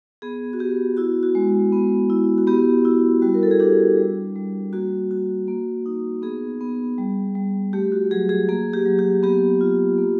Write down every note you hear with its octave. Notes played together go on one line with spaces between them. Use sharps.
B3 G#4
F#4
B3 G4
E4 F#4
F#4
G#3
B3
E4
F#4
B3 G4
E4 F#4
G3 F#4
A#4
A4
G#4
D4 G4
G3
G3
A#3 F#4
F#4
A#3
D#4
B3 G#4
B3
G3
G3
A3 G4
F#4
F#3 G#4
G#4
A#3 G#4
G4
F#3
G4
B3 G4
F4
A#3